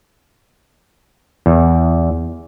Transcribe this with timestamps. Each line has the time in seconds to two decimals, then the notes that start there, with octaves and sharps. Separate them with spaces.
1.46 E2